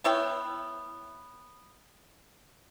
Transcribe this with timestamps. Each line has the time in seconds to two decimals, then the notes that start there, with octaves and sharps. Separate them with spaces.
0.04 B3 E4 C#5 G5